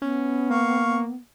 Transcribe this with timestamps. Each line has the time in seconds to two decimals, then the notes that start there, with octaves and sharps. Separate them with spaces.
0.02 B3 C#4
0.50 A#3 F5 C#6